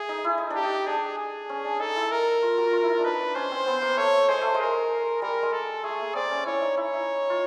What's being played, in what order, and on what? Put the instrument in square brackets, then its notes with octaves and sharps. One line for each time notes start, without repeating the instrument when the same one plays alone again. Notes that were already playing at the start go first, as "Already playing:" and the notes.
Already playing: [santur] A3 [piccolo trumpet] G#4
[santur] D#4
E4
D#4
D4
[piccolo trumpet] G4
[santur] D#4
[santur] D4 [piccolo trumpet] G#4
[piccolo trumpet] G#4
[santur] C#4
D4
[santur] D#4 [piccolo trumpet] A4
[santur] E4
[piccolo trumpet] A#4
[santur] F4
F#4
F4
E4
D4
[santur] D#4 [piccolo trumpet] B4
[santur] D4
[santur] C#4 [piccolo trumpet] C5
[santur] C4
B3
A#3
[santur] A3 [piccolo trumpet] C#5
[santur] G#3 [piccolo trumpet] C5
[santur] A3
G#3
[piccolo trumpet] A#4
[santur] G3 [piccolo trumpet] A#4
[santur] G#3
[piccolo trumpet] A4
[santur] A3 [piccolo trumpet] G#4
[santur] A#3
[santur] C4 [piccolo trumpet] D5
[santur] C#4
[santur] E4 [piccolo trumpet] C#5
[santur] D#4
[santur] E4 [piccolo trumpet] C#5
[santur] D#4
F4